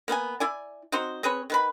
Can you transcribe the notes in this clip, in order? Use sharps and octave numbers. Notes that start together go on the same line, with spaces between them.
A#3 B3 F5 G#5
E4 D5 G#5
C4 D#4 F#4 C5
C4 G#4 B4 C#5
D#3 B4 B5